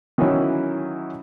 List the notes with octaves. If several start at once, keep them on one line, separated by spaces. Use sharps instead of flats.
D#3 E3 F#3 C#4 E4